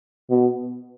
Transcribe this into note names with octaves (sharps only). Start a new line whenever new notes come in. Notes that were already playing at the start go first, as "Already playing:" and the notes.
B2